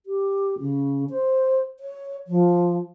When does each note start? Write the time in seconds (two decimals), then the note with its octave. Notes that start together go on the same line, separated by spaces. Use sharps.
0.06 G4
0.59 C#3
1.10 C5
1.80 C#5
2.27 F3